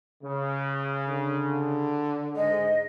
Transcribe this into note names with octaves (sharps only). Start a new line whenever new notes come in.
C#3
D3
G#2 G#3 D#5